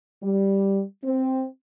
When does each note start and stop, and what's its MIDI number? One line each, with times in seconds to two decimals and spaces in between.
0.23 0.83 55
1.04 1.45 60